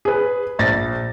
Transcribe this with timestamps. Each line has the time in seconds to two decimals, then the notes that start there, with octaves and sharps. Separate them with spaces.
0.05 G#4 B4
0.59 A#1 A6 A#6